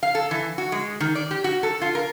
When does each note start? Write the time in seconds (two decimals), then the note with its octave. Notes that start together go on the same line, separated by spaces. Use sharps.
0.03 F5
0.15 A4
0.31 E3
0.58 F#4
0.72 G#3
1.00 D#3
1.15 D5
1.31 G4
1.44 F#4
1.63 A4
1.82 F4
1.95 A#4